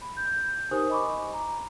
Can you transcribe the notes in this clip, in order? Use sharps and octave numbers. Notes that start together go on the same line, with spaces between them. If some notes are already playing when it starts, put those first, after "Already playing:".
B5
G6
D#4 G4 A#4 C5 G#5 D#6
D#5 G#5 B5 C#6 D6
A#5